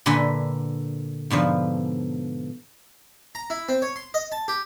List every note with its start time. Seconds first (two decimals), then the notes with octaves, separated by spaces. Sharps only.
0.06 A#2 D3 A4 B4 E5 G#5
1.30 G#2 B2 D3 F3
3.35 A#5
3.50 E4
3.69 C4
3.82 C#5
3.96 C6
4.14 D#5
4.32 A5
4.48 G4